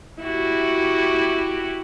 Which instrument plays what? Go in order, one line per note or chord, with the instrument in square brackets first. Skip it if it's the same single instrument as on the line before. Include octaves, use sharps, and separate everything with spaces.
[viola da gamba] E4 F#4 G4